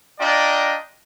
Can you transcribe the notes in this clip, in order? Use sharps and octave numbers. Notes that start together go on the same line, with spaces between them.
D4 F4 D5 D#5 G5 A#5